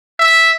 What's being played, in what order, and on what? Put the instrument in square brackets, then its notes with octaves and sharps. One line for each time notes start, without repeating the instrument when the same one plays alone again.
[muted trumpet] E5